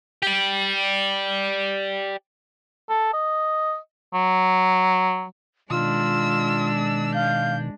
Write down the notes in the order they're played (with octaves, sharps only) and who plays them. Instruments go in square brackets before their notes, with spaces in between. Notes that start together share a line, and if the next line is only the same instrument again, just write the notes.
[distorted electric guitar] G4 D5
[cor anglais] A4
D#5
F#3
[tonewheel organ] B2 D#3 [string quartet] G#3 D4 [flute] F4 [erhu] E6
[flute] F5 [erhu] G6